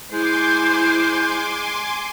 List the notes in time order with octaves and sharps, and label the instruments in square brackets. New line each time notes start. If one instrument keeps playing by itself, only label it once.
[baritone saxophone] G#3 [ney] E4 [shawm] C5 [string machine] G#5 C6 D6